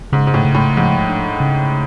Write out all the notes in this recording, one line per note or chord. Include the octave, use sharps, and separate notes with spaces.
G#2 C#3
G#2
A2
C#3
A2
G#2 F3
D4
C#3